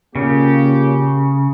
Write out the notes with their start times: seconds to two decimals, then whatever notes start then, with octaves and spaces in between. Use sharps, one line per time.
0.15 A#2 C#3 A#3 C#4 G4